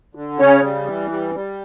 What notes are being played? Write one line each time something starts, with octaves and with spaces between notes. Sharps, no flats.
D3
C#3 C#4 C#5
G3
E3
G3
G3